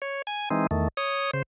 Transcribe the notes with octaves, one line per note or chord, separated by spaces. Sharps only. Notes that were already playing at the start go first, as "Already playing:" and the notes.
C#5
G#5
E3 G#3 C4 D#4
E2 D#3 A3
C#5 D#6
C#3 C5